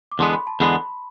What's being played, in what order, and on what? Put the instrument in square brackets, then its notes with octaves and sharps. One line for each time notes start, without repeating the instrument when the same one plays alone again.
[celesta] D6
[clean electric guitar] E2 D3 G#3 B3 [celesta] C6
[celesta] B5
A5
[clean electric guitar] E2 D3 G#3 B3 [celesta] B5